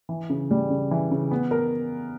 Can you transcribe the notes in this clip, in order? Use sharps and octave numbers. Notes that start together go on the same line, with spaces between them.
E3
C#3
G3
C#3
E3
C#3
B3
A#4